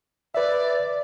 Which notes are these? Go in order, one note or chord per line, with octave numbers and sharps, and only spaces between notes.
B4 D5 E5